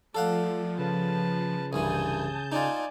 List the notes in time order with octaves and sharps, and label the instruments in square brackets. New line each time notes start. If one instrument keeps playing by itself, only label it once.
[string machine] F3 [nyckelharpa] A3 D5 [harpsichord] A4 F5 F#5
[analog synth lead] C#3 [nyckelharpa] B4 A5
[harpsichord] C2 G2 E3 [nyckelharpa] G#5 D#6 [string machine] A5 G6
[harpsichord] D#4 F4 [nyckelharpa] D5 G#5